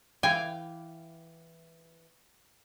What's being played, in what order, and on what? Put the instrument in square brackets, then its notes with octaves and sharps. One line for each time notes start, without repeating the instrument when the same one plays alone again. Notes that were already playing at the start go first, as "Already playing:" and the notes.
[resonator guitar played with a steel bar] E3 F5 G5 [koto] G#5